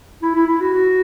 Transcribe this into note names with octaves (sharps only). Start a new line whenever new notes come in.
E4
E4
E4
F#4
F#4